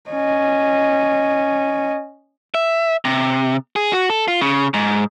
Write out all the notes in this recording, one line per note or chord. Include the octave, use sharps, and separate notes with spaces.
C#4 D#5
E5
C3
G#4
F#4
A4
F4
C#3
G#2